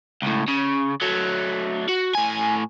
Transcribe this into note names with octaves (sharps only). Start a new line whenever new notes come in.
C#2 A2
C#3
F#3 A3
F#4
A2 G#5